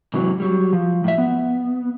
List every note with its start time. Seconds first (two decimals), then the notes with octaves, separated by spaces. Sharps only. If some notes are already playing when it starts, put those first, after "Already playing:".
0.14 G#2 C3 E3 F#3
0.40 F#3 G3
0.73 F3
1.04 A2 E5
1.18 B3